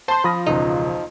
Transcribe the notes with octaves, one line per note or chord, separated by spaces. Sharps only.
C5 A5 C6
F3 B5 D#6 A#6
E1 C#2 D#4